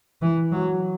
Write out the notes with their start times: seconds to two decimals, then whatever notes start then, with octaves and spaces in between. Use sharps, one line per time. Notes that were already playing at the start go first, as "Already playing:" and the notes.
0.22 E3
0.52 F#3